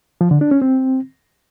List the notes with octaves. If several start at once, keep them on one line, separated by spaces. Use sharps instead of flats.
F3
D3
D4
C#4
C4